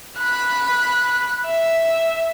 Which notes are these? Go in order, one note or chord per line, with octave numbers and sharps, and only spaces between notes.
B5 F#6
E5